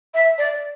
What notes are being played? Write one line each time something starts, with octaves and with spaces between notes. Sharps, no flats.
E5
D5